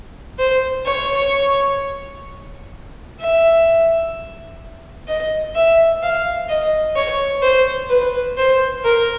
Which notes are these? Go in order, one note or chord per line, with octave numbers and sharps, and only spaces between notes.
C5
C#5
E5
D#5
E5
F5
D#5
C#5
C5
B4
C5
A#4